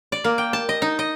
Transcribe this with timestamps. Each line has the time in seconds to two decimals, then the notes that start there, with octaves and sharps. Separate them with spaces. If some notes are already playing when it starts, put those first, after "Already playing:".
0.12 D5
0.24 A#3
0.38 G5
0.53 A5
0.69 D#5
0.82 D#4
0.99 D#5